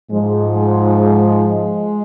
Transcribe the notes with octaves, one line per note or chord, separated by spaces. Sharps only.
G#2 F3 G#3
G#3